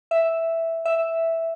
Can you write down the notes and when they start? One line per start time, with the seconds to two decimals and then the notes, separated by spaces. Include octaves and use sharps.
0.11 E5
0.85 E5